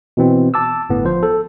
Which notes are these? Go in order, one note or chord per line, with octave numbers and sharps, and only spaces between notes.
B2 E3 C4
A5 D6 E6
G1 A2 B3
F3 C5
A4